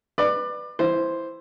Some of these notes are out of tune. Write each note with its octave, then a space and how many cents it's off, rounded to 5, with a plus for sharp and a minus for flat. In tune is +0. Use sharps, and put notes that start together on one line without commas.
B4 +0 D5 +25
E3 +0 C5 +0